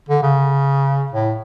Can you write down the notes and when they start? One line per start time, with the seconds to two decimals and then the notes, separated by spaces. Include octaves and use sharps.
0.09 D3
0.23 C#3
1.13 A2